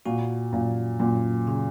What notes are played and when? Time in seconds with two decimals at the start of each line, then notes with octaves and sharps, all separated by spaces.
0.06 A#2 F#4
0.53 F#2 A#2
1.00 F#2 A#2
1.47 C#3